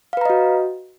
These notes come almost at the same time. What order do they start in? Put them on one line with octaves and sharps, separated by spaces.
F5 B4 A#5 D#5 F#4